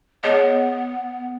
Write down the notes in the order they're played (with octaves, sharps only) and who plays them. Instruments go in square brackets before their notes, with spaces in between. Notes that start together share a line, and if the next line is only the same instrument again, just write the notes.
[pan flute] B3 [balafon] G#4 C#5 D#5